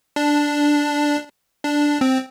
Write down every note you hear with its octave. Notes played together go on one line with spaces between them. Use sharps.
D4
D4
C4